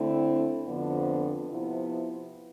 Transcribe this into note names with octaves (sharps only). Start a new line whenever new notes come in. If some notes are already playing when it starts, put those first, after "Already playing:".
Already playing: D3 A3 C4 E4
F2 D3 F3 B3
C3 F3 B3 E4